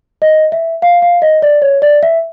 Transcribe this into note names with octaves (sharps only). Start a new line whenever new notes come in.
D#5
E5
F5
F5
D#5
D5
C#5
D5
E5